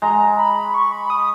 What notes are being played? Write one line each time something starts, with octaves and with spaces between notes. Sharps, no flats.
G#3 A#5
B5
C#6
B5
D#6